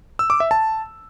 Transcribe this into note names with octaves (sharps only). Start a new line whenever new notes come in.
E6
D6
E5
A5